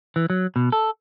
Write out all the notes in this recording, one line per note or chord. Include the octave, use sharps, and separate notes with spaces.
E3
F#3
B2
A4